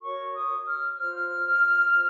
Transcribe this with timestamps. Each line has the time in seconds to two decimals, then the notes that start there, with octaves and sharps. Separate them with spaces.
0.02 F#4 A#4 C#5 C#6
0.34 D#6
0.65 F6
0.97 F4 C5 F6
1.92 F4 C5